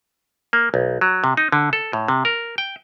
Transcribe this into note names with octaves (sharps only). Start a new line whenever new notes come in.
A#3
B1
F#3
C3
D#4
D3
A4
A2
C3
A#4
G5